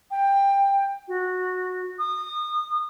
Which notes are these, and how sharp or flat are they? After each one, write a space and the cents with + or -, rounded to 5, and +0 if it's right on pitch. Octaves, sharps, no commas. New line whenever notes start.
G5 +15
F#4 -15
D#6 -30